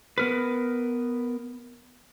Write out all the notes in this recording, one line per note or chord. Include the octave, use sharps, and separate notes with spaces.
B3 A#4 B4